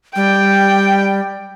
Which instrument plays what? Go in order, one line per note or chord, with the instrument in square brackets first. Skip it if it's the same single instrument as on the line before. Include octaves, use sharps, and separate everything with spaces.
[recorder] G3 [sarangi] G5